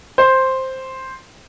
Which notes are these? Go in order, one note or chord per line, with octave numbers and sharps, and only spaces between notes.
C5